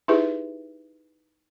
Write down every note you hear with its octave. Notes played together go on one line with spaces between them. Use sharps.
D#4 E4 G4 G#4 B4 E5